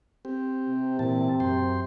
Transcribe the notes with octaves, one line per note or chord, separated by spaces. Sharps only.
C4 G4
C3
A#2 E3 A5
F#2 G5 C6